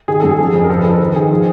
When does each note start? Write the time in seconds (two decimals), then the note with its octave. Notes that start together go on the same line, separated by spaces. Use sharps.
0.08 D#3 G#4
0.20 F#2 A4
0.31 G#4
0.39 F3
0.53 F2
0.64 A#4
0.70 F3 A4
0.79 B4
0.85 F3
0.90 A#4
1.00 D#3
1.15 D#3 G#4
1.31 F3